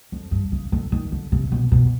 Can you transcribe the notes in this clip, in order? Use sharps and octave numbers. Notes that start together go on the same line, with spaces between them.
F2
G2
C#3
D3
D#3
D3
C3
B2
B2